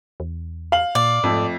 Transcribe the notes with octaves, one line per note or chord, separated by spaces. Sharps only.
E2
F5 F#7
A#2 D5
F2 G#2 A3